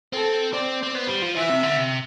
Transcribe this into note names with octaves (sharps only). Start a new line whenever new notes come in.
C4 A4
C4 D5
C4
B3 C5
G3
F3
E3 E5
C3
D3
C3